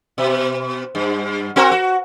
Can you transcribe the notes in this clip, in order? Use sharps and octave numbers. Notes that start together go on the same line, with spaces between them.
B2
G2
C4 F#4 A#4
F#4